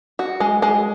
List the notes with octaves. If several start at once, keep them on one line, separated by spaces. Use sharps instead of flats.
F#4
G#3
G#3